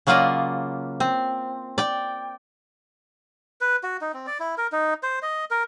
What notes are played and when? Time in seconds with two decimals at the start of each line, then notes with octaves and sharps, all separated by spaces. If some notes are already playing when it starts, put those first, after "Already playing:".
0.07 C#3 F#3 A#3 F4 D5 D#5
1.00 C4
1.78 D5 G5
3.61 B4
3.83 F#4
4.01 D#4
4.14 C4
4.27 D5
4.40 E4
4.58 A#4
4.72 D#4
5.03 C5
5.22 D#5
5.51 A#4